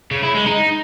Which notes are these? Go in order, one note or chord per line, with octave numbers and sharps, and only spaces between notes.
C#3
E4
G#3
D#4